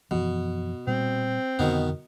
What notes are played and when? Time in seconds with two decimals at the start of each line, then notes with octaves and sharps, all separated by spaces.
0.11 F#2 B2 E3 F3
0.87 A#2 G3 C4
1.59 F2 B2 D3 D#3 B3